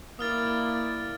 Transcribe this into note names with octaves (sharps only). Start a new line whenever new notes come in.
A#3 E4 D5 D#6 F6 A6